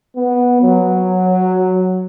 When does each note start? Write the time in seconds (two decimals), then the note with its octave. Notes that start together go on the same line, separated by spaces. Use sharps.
0.16 B3
0.62 F#3